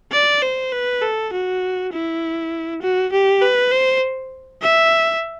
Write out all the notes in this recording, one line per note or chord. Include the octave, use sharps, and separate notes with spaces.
D5
C5
B4
A4
F#4
E4
F#4
G4
B4
C5
E5